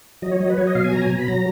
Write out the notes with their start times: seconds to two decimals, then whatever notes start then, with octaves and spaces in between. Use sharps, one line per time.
0.22 F#3 D#5
0.31 C#5
0.40 F#3 D#5
0.50 B4
0.58 F#3 C#5
0.67 D#5
0.75 B2 F5
0.84 G#5
0.93 F#3 A#5
1.02 G#5
1.10 B2 A#5
1.20 B5
1.28 F#3 A#5